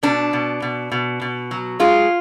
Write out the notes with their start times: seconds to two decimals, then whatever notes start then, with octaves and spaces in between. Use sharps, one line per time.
0.03 B2 D4
0.33 B2
0.62 B2
0.92 B2
1.21 B2
1.51 F#3
1.80 G#3 F4